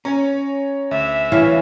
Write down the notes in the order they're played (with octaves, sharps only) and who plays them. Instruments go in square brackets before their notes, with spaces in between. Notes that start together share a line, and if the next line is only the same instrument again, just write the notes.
[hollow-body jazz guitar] C#4 [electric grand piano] C#5 G#5 A#5
[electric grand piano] D2 [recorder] E5
[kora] E3 C#4 F5